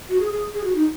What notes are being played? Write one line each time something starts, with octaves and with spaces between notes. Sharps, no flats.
F#4
G#4
G#4
G#4
F#4
D#4